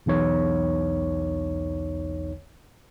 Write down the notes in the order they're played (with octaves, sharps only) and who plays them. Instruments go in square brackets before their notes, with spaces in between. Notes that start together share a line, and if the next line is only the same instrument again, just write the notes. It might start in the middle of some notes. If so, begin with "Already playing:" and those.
[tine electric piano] B1 E2 D#4 C#5